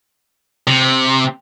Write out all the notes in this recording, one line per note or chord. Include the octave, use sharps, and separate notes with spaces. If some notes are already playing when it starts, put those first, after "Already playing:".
C3